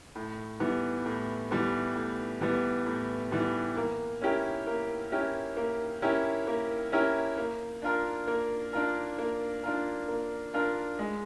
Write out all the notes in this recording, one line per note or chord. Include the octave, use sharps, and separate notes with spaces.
A2
E3 G3 B3
A2
E3 G3 B3
A2
E3 G3 B3
A2
E3 G3 B3
A#3
C#4 E4 G4 A#4
A#3
C#4 E4 G4 A#4
A#3
C#4 E4 G4 A#4
A#3
C#4 E4 G4 A#4
A#3
D4 F4 A#4
A#3
D4 F4 A#4
A#3
D4 F4 A#4
A#3
D4 F4 A#4
G#3